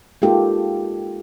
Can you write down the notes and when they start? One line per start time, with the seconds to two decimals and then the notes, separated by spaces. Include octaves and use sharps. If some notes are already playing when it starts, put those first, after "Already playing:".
0.22 G#3 A#3 D#4 F4 G4 A4